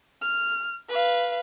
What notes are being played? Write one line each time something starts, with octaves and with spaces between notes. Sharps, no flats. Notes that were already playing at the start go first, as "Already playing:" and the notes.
F6
B4 F5